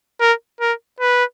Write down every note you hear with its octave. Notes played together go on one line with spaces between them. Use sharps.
A#4
A#4
B4